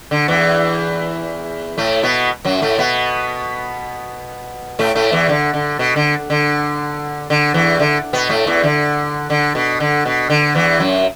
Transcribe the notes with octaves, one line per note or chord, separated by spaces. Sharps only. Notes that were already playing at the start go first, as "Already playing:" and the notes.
D3
E2 E3
A2 A3
B2 B3
F#2 F#3
A2 A3
B2 B3
A2 A3
A2 A3
E2 E3
D3
D3
B2
D3
D3
D3
E2 E3
D3
B2 B3
A2 A3
E2 E3
D3
D3
B2
D3
B2
D3
E2 E3
F#2 F#3